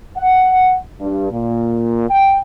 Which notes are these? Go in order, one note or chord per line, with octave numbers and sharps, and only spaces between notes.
F#5
G2
A#2
G5